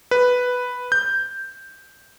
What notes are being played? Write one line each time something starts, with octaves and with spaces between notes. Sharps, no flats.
B4
G6